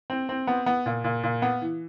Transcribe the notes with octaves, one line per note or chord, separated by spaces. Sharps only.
C4
C4
B3
B3
A#2
A#2
A#2
B3
E3